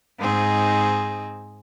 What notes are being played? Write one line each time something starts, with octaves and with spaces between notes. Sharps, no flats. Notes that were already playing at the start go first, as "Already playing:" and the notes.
G#2 C4 D#4 G#4